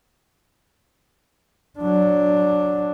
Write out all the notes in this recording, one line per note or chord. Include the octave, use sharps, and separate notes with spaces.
F#3 D4